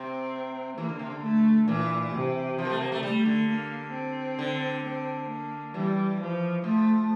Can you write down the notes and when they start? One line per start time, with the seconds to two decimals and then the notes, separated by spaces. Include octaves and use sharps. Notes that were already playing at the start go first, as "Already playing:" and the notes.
Already playing: C3 C4
0.77 E3 A#3
0.89 D3
0.99 C3
1.10 D3
1.22 A3
1.68 A#2 E3
2.13 C3
2.58 F3
2.65 A#3
2.70 A3
2.81 A#3
2.92 A3
3.03 G3 A3
3.25 D3
3.48 A#3
3.94 C4
4.39 D3
4.84 C4
5.29 A#3
5.74 E3 G3
6.20 F3
6.64 F3 A3